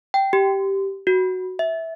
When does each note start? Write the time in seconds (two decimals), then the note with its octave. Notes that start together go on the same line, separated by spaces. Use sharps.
0.14 G5
0.33 G4
1.07 F#4
1.59 E5